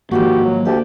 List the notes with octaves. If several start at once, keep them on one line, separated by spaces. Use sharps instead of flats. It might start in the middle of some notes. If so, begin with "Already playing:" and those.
G#2 D#3 F3 A#3 F#4 G4
F#3
D2 G4 D5